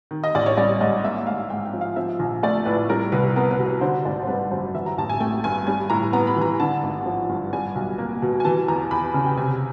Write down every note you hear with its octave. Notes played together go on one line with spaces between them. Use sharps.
D#3
D#5
A1 D5
C#5
G3 D5
G#2 D#5
A#3 E5
G#2 F5
G#2 G5
G5
F3
F5
F3 E5
A#1
A3 D5
A2 B4
G3 A#4
C2 B4
B3 A#4
B4
B2
B4
D3 C5
G#1 D5
C5
G3 B4
F#2 C5
E3 E5
A#5
A1 A5
G#5
A3 G5
G2 G#5
G3 G#5
A2 A#5
B3 A#5
B5
E3 A#5
D3 A5
G#1
F3
G2
G3 G#5
B1
A#3
B2
G#5
E3 A5
E2 A#5
E2 B5
C#3
G5
C3 G#5